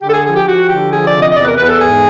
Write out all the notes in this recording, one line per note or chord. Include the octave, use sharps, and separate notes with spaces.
D3 G4
A4
G#4
F3 G#4
G4
F3 F#4
D3 G4
F3 G#4
D5
C3
D#5
D#5
E2 D5
B4
A#4
E2 B4
A4
G#2 G#4